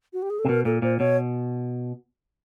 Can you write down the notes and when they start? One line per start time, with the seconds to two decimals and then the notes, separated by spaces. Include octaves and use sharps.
0.13 F#4
0.22 G4
0.30 G#4
0.39 A4
0.45 C3
0.48 B2 A#4
0.65 A#2 A4
0.82 A#2 C5
0.99 B2 C#5